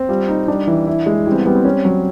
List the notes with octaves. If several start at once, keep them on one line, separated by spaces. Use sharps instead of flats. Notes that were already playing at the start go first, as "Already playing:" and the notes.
Already playing: C4
G3 F4
D#4
G3 D4
E3
E4
G#3
G3 E4
C4
B3
G3 B3
C4
C#4
F#3